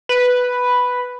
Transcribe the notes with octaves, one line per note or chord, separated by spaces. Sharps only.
B4